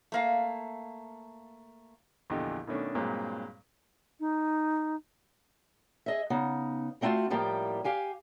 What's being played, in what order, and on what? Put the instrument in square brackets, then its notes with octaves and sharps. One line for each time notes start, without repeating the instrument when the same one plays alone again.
[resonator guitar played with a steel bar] A3 A#3 F5
[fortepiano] A#1 E2 D3 G4 D#5
B2 D#3 A3 C#4 D4
G2 A#2 F#3 G#3 C4
[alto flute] D#4
[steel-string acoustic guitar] G#4 D#5 E5
C#3 B3 D#4
G3 A3 C4 D#4 F4 F#4
A2 F3 G3 A#3 G4
G4 F5 G#5